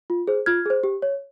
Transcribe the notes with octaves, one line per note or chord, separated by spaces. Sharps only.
F4
G#4 C5
F4 F6 G#6
G#4 C5
G4
C#5